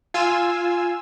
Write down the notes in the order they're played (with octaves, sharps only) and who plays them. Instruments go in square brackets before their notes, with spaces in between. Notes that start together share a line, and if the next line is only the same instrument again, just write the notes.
[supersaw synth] F4 G#5 E6